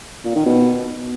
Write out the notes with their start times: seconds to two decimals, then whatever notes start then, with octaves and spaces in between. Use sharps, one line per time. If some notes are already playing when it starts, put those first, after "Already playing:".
0.25 A#2
0.35 D#3
0.46 B2